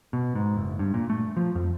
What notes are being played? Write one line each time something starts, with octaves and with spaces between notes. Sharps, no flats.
B2
G#2
F#1
G2
A#2
A3
F3
F2